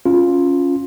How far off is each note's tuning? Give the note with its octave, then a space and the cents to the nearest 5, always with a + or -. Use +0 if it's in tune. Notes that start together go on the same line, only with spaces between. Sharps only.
C#4 +0 F4 +5